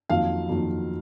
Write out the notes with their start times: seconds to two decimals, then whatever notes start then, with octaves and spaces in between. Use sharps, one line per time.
0.09 F2 D#3 F#3 A#3 F5
0.49 F2 D#3 F#3 A#3